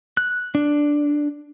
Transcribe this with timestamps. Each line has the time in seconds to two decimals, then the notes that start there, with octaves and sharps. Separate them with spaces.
0.17 F#6
0.55 D4